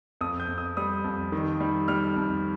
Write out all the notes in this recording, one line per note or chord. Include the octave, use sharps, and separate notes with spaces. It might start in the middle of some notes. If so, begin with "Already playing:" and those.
F2 D#6
G6
F2
D#6
G3 D#6
F2
D#3
G3
G3 F6
F2